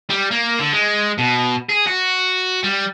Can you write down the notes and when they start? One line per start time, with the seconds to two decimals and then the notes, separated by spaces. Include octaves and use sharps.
0.10 G3
0.31 A#3
0.59 D3
0.73 G#3
1.18 B2
1.70 G#4
1.88 F#4
2.63 G3